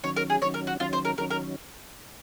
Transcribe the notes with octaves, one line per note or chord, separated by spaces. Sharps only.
D#3 F#3 C#4 C#5
A#4
G#4
D#3 F#3 C#4 C#5
A#4
F#4
D#3 F#3 C#4 F4
C5
A#4
D#3 F#3 C#4 A#4
A#4